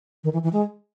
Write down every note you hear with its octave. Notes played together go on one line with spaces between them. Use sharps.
D#3
E3
E3
G#3